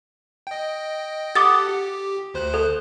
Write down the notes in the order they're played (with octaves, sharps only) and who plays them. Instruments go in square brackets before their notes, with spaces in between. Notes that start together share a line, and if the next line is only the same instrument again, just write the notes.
[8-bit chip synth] D#5 G5
[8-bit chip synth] G4 A4 F#5 [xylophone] D6 D#6 A6
[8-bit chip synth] G4
D2 C5 F#6
[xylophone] A4